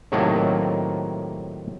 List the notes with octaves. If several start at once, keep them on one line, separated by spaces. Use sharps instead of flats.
A2 C3 D#3 F#3 A3 A#3